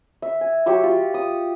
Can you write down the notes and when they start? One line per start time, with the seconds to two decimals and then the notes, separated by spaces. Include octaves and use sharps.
0.22 E5
0.41 G#5
0.66 F#3 G4 C#6 E6
0.84 F4
1.14 D#6